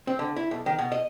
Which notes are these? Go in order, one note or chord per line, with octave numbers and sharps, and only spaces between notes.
C4
D3
E4
B1
D#3
B2
D#5